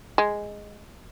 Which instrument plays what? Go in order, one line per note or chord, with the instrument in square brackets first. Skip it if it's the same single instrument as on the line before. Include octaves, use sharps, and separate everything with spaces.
[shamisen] G#3